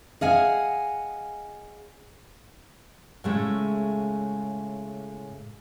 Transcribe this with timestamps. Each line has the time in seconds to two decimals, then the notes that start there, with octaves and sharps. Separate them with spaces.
0.21 G#4 D#5 F5 F#5 G#5
3.24 A2 C#3 G#3 A3